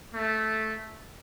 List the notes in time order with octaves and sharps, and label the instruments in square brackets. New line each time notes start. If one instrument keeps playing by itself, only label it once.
[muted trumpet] A3